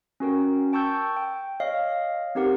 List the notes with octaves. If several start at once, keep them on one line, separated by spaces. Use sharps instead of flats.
C#4 F#4 A#4 G5
G5 A5 C#6 E6 G6
G5
C#5 D#5 F5
C4 D#4 G4 A#4 F#5